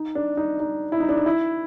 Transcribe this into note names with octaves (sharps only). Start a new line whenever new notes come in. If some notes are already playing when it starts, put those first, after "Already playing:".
Already playing: D#4
D4
D#4
D#4
E4
D#4
D4
D#4
E4